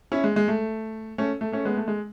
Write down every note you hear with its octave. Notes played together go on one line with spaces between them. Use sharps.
C#4 E4
G#3
G#3
A3
A3 C#4
A3
A3 C#4
G#3 B3
A3
G#3